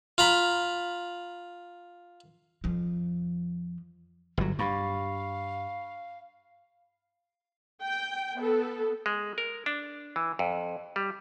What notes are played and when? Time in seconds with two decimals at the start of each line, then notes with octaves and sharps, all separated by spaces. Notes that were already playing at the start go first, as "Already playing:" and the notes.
0.18 F4 A#5 B5
2.64 F2 F3
4.37 G1 F#3
4.59 G2 F5 B5 C#6
7.82 G5
8.37 B3 A4
9.06 G#3
9.38 A#4
9.66 D4
10.16 E3
10.39 F2
10.96 G3